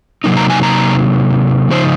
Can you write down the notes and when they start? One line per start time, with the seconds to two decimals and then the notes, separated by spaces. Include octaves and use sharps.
0.24 C3 F#3 A#3 D#4
0.37 A#5
0.50 G#5
0.63 A#5
1.71 C#3 F3 D#4 C5